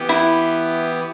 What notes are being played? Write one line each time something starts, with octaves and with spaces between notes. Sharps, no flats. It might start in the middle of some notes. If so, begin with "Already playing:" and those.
Already playing: E3 B3 G4
E4